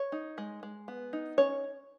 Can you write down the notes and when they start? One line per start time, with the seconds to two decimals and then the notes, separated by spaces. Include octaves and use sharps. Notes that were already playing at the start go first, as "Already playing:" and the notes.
Already playing: C#5
0.12 D#4
0.38 G#3
0.63 G#3
0.88 B3
1.13 D#4
1.38 C#4 C#5